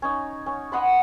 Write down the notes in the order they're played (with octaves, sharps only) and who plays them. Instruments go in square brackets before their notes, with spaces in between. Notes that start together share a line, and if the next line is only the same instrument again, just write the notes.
[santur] C#4 D#4
C#4
D#5 F#5 B5 C6